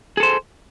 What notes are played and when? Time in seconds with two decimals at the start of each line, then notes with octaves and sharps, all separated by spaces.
0.17 G#4
0.20 A4
0.23 C5